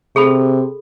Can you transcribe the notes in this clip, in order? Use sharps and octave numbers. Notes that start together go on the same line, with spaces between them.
C3 G#4 A4 B5